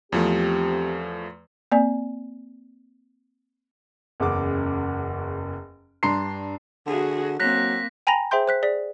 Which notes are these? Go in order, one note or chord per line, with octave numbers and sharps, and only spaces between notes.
E2 F3 A3 C4 G4
A#3 C4 D5 G#5
F#1 E2 C#3 D6
G2 D4 A#5 C6 C7
D3 F#4 G#4
F#3 A#3 C4 F#6 A#6 B6
G5 G#5 A#5 B5 A#6 F7
G#4 C5 E5 G5 C6 G6
C5 F#6 B6
G#4 D5 B6